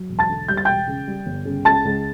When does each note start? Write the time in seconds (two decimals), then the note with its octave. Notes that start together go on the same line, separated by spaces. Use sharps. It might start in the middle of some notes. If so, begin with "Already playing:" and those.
Already playing: F#3
0.09 E1
0.19 A5 A6
0.29 D3
0.48 G3 G6
0.57 A6
0.65 E1 G5 G6
0.87 C#3
1.07 G3
1.26 G1
1.45 C#3
1.65 C#2 A5 A6
1.85 C#2